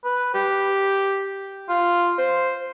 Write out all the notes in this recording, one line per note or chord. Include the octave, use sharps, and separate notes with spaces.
B4
G4
F4
C5